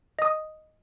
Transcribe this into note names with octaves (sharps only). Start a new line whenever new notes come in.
D#5 D#6